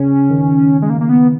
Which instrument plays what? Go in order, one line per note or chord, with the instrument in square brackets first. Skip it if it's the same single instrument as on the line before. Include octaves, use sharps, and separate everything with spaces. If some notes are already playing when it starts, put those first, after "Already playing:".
Already playing: [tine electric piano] C#3 [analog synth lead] C#4
[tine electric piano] D#3
[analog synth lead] G#3
A#3
A#3
B3